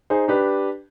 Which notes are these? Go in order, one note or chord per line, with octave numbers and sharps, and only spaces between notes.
D#4 G#4 C5
D4 G4 B4